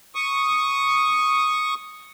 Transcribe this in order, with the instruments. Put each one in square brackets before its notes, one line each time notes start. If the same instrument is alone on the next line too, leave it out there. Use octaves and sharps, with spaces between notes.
[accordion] C#6 D#6